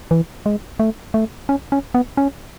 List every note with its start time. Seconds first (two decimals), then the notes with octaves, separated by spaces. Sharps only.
0.11 E3
0.46 G#3
0.80 A3
1.14 A3
1.49 C#4
1.72 C#4
1.94 B3
2.17 C#4